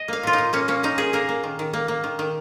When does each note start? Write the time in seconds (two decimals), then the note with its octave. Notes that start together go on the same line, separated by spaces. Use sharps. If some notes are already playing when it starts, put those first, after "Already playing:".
Already playing: D#5
0.08 A#3 F5
0.23 A#2 F4
0.33 D#4
0.38 A#2
0.53 A#3 C#4
0.68 A#3 C#4
0.83 A#2 D#4
0.98 A#2 G#4
1.13 A#3 A#4
1.29 A#3
1.44 D#3
1.59 D#3
1.73 A#3
1.88 A#3
2.04 D#3
2.19 D#3